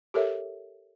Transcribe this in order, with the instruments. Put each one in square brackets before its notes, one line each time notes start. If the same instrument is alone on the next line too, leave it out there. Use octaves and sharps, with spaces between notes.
[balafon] G4 A4 A#4 C#5 E5